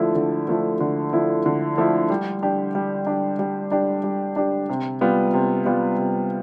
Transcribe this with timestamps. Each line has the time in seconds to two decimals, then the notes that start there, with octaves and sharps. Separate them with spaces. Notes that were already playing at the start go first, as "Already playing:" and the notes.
Already playing: D3 F3 A3 E4
0.15 D3
0.48 F3 A3 E4
0.80 D3
1.13 F3 A3 E4
1.46 D3
1.78 F3 A3 E4
2.10 G3
2.42 D4 G4
2.75 G3
3.07 D4 G4
3.39 G3
3.71 D4 G4
4.04 G3
4.36 D4 G4
4.69 C3
5.01 G3 B3 F4
5.34 C3
5.66 G3 B3 F4
5.99 C3